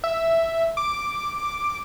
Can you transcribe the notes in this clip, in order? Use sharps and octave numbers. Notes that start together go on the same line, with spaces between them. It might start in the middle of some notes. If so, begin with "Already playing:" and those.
E5
D6